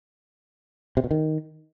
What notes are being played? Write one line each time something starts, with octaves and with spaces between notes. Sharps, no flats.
C3
B2
D#3